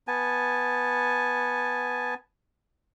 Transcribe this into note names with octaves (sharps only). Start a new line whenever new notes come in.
B3 G#5 A5